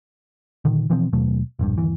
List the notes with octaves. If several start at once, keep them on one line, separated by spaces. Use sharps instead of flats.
A#2 D3 D#3
B2 E3 F3 C4
D#2 B2 F#3 A3
E1 A#1 G2
G1 D#2 E3